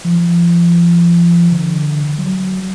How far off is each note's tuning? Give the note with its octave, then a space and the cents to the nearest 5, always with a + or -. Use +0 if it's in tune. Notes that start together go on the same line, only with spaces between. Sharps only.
F3 -30
D3 +10
F#3 +20